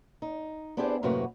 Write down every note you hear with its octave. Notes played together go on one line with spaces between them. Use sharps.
D#4
B3 C4 D4 E4 G4 G#4
F#2 A2 C3 A#3 F#4 B4